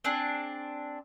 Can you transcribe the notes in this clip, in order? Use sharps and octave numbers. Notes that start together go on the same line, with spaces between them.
C4 D4 G#4